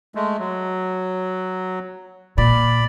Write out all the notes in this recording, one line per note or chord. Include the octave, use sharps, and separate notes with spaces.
G#3 A3
F#3
A#2 D5 B5